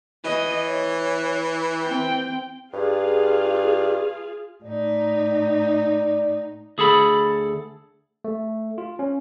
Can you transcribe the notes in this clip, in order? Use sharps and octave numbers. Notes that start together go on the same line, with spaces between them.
E3 D#5
C#5
C4 G5
G2 F4 G#4 F5
A2 D#4 D5
D2 G#4 A4 B5
A3
F4
C#4